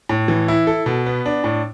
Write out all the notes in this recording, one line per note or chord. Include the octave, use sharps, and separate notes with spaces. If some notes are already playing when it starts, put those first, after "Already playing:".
A2
E3
E4
A4
B2
B3
D4
A2